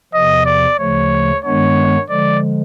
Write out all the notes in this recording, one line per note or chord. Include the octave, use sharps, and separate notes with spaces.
E2 C3 F3 D#5
D5
D2 C#3 F3 A3 C#5
G2 D#3 G#3 B3 D4 C#5
D3 F3 G#3 D5